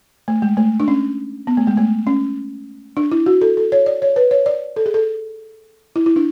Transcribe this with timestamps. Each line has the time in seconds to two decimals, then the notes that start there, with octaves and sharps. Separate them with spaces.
0.28 A3
0.42 G#3
0.57 A3
0.80 D4
0.88 C#4
1.47 B3
1.57 A3
1.67 G#3
1.77 A3
2.07 C#4
2.97 D4
3.12 E4
3.26 F#4
3.41 A4
3.57 A4
3.72 C#5
3.86 D5
4.02 C#5
4.16 B4
4.31 C#5
4.46 D5
4.76 A4
4.86 G#4
4.94 A4
5.96 E4
6.06 E4
6.16 D4